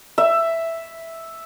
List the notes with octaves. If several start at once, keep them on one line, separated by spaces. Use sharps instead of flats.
E5